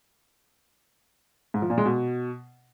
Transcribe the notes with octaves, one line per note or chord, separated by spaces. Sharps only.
G#2
F3
A#2
G#3
B2